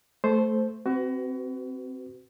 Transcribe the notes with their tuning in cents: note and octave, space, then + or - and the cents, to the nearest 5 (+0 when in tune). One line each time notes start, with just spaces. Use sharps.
A3 +0 A4 -20 C5 +0
C4 -5 F#4 +25 B4 +35